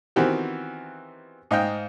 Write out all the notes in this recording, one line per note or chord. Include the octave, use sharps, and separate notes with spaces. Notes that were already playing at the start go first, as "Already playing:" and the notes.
D#3 E3 B3 C4 F#4 G4
G#2 D#5 F5 G5